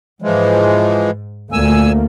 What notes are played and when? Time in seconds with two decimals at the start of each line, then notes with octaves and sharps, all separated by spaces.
0.22 G#2 E3 F3 G#3
1.52 D2 A#2 A3 A#3 G#5 E6